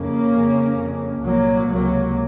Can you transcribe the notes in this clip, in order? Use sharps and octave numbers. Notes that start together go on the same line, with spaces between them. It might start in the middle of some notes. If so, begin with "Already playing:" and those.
Already playing: F2 C#3 A#3 C#4
F2 C#3
F2 C#3
C2 A#2 F#3 A#3
C#2 C3 F#3 A#3